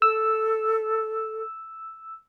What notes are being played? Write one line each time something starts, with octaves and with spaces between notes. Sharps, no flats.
A4 E6